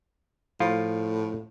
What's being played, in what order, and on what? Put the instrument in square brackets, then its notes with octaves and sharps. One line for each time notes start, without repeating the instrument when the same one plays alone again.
[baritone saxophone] A2 [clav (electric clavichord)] F3 F4